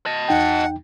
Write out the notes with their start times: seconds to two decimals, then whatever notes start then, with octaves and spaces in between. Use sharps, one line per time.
0.06 D#5 A5
0.29 E2 D#4 F#5 G5